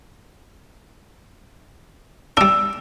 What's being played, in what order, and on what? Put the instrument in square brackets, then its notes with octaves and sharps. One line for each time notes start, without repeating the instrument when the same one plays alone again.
[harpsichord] G3 D4 [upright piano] E6